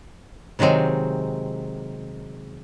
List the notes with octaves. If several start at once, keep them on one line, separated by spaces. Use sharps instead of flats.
C3 D#3 F#3 G#3 C4